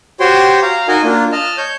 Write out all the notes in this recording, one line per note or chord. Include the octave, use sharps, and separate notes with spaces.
F#4 G4 C5 C#5 G5 C6
F5 A#5
D#4 F#4 A#4 D#5 G#5
A#3 D4 F4
D#5 A5 F6
C#5 G6